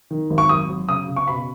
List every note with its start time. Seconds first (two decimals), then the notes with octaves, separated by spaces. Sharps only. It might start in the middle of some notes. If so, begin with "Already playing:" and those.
0.11 D#3
0.30 G#1
0.38 C#6
0.49 F#3 D#6
0.69 F#3
0.89 C#3 D#6
1.08 C#3
1.16 C#6
1.28 B2 B5